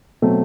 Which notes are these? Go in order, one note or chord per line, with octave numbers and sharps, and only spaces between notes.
B2 F#3 A3 C4